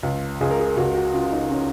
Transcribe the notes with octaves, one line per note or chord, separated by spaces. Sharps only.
C#2
C#2 G#4
A#4
G#4
C#2 F#4
F#4
C#3 F4
D#4
C#4